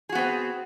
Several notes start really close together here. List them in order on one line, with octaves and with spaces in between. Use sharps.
G#4 F#4 B3 C4